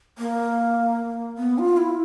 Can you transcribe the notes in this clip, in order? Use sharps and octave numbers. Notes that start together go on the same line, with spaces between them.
A#3
B3
F4
E4